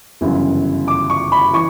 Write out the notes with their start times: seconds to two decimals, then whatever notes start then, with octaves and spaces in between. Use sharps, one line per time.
0.21 G1 F#2 C#3 E3
0.88 D6
1.10 C#6
1.32 B5
1.53 E3 C#6